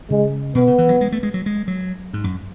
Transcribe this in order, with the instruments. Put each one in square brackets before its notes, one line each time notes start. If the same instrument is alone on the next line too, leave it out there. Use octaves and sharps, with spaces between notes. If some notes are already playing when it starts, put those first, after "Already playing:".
[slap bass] C#3 [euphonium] G#3
[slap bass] B2 [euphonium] B3
[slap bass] C#3
E3
F#3
G#3
A3
G#3
F#3
G#3
F#3
G#2
F#2